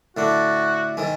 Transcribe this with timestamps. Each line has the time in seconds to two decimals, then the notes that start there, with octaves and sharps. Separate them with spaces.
0.17 A2 D3 D4 F#4
0.97 G#2 D#3 G#3